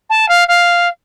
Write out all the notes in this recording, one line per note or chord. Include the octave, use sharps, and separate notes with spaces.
A5
F5
F5